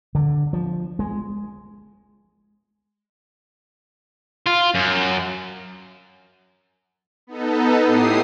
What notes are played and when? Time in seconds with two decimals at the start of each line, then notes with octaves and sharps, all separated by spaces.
0.15 D3
0.53 F3
0.99 G#3
4.46 F4
4.75 F#2
7.27 B3 D#4 A4
7.84 A2 E4 G4 D#6 C7